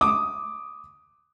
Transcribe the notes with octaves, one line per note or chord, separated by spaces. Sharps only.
D6 D#6